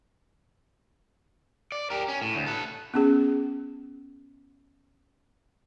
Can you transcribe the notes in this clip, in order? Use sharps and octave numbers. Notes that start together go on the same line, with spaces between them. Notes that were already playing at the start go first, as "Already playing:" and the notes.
D5
G4 A#4
C#4
A2
D2
A4 B4
B3 C#4 G#4